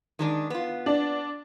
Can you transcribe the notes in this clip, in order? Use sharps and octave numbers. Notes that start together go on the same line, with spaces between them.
D#3 G#3 D4
B3 F4
D4